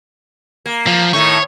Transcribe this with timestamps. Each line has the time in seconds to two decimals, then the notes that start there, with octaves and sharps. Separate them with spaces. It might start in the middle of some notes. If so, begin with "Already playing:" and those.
0.66 A#3
0.87 F3
1.13 A2 D#3 A3 C#5